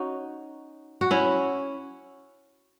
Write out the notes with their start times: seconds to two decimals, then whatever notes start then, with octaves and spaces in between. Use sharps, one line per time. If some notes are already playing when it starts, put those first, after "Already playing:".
Already playing: C#4 D#4 F#4
1.01 F#4
1.11 C#4 E4